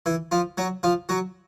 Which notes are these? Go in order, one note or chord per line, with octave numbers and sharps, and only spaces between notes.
E3 E4
F3 F4
F#3 F#4
F3 F4
F#3 F#4